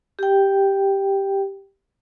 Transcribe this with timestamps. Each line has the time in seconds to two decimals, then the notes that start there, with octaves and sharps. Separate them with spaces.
0.19 G4 G5